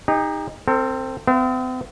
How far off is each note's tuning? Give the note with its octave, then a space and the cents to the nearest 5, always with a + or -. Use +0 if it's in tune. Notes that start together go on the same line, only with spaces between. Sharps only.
D#4 +0 G4 +40
C4 +0 A4 +40
C4 -45 F5 -40